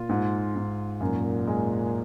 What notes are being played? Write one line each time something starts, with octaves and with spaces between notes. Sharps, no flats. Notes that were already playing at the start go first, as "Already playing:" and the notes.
Already playing: A#2 F4
G#2
G#2
F#2 A#2
G#3